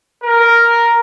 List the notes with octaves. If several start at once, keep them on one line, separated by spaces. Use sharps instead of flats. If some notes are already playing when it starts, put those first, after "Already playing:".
A#4